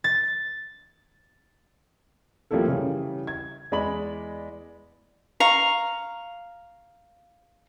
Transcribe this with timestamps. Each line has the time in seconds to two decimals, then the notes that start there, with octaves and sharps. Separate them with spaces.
0.04 A6
2.51 F3 G3 A3 A#3 E4 A4
2.68 C#3 E3 G3
3.27 G#6
3.72 E2 G#3 D5 D#5 B5 F#7
5.40 F5 A#5 C#6